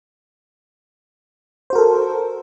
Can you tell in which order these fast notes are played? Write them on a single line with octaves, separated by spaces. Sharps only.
C5 F#4 A#4 A4